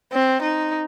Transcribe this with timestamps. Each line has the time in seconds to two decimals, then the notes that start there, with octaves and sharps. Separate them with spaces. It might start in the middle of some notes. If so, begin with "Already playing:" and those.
0.12 C4
0.42 D#4